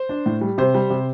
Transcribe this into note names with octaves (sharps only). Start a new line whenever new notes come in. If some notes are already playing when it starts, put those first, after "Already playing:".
Already playing: C5
D4
A2
G3
C3 C5
G3
C3